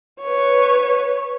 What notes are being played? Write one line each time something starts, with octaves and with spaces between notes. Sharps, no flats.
B4 C#5